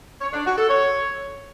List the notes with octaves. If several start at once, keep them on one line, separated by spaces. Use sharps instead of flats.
C#5
D4
F#4
A4
C#5